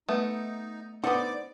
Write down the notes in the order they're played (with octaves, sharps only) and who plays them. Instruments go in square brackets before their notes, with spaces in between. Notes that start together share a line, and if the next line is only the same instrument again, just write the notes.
[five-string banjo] A3 [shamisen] B3 [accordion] D#4
[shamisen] D3 B3 [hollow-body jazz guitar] D#4 C5 F#5 [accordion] D5 D6